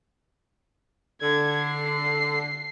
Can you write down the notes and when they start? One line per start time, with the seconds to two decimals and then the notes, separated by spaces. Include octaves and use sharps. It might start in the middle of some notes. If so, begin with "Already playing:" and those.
1.22 D3 G#6
1.65 C7